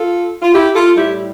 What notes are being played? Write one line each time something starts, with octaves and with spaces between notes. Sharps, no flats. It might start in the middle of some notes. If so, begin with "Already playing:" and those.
Already playing: F4 A4
F4
E4 G4
F4 A4
A2 G3 E4 G4